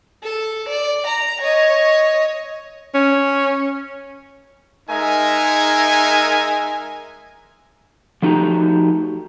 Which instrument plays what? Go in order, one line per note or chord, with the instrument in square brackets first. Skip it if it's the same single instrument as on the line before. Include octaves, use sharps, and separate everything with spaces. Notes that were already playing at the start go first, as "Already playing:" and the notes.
[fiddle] A4
D5
A#5
C#5 D#5
[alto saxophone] C#4
[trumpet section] G#3 D#4 A#4 E5 G#5
[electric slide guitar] F3 A3 D#4 F#4 G4 A#5